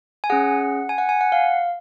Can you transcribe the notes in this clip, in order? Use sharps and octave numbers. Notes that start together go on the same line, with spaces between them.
G#5
C#4 G#4 F#5
G#5
F#5
G#5
F#5
F5